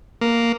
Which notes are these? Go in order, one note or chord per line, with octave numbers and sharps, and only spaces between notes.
A#3